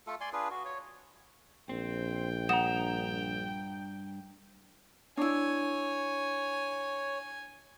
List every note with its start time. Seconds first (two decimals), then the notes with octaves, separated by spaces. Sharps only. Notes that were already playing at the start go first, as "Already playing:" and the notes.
0.07 A3 F4 A4
0.21 D5 G#5 C6
0.33 D4 F4 G#4 B4
0.50 F#4
0.65 C#5
1.69 A#1 C4 G5
2.49 G2 F#5 A#5 D#6 E7
5.17 D4 E4 C#5 G#5